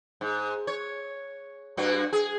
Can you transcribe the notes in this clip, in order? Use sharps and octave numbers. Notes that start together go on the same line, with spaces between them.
G#2
C#5
G2 A#3 F#4
G#4